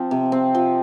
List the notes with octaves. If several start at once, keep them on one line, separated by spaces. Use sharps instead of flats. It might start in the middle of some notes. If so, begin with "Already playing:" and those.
Already playing: F3 C4
C3
C4
F3